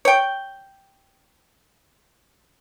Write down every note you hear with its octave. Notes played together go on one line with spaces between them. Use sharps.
C#5 G5